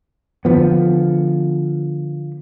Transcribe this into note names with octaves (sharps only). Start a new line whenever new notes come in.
D3 F3 B3